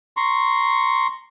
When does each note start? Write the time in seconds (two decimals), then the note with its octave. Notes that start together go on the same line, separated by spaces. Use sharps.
0.17 A#5 C6 C#6